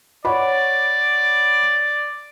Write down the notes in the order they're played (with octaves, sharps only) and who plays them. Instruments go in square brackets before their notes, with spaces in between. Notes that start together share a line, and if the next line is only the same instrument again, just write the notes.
[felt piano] C#5 F#5 B5 [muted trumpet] D5